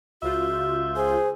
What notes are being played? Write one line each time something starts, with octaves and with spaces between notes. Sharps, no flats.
C#2 F4 F#4 E5 G6
G#4 C5